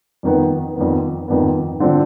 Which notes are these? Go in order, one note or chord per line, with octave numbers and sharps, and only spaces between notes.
F2 D#3 B3
F2 D#3 B3
F2 D#3 B3
D3 F3 C4